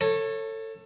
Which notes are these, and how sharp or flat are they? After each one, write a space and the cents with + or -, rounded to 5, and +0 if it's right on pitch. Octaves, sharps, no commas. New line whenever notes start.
A4 +20 C#5 -15